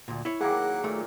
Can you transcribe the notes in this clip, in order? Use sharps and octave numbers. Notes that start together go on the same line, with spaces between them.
D2 A#2
E4 C#5
D#3 F#3 A#3 G#4 F#5
A#2 A3